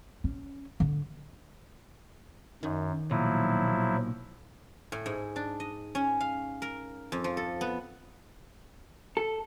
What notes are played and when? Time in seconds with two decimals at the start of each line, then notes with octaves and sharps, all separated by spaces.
0.24 C#4
0.80 D3
2.63 F#2 D#3
3.11 B1 A#2 F3 F#3 E4
4.92 A2
5.06 G#2
5.36 D4
5.60 D#5
5.95 C#4
6.20 F5
6.62 A#4
7.12 F2
7.24 F3
7.37 A4
7.61 B3
9.17 A4